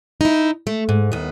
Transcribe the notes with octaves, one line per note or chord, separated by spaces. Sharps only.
D#4 E4
A3
G#2
D#2 B3